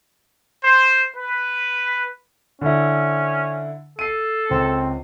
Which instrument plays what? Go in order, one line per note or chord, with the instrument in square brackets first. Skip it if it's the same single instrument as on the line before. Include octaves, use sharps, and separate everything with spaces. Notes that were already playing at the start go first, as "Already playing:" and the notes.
[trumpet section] C5
B4
[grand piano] D3 E4 [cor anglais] C#4
[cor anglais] A4 [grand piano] C7 D#7
[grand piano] C#2 [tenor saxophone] C4